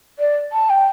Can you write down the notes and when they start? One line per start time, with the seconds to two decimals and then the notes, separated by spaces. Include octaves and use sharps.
0.19 D5
0.52 A5
0.70 G5